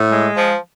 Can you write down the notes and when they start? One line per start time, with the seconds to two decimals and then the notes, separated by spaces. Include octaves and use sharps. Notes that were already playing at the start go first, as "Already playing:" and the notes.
Already playing: A2
0.11 G#3
0.37 F3